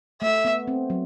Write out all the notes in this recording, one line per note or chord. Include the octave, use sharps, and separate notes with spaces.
A3 E5
B3
C4
F#3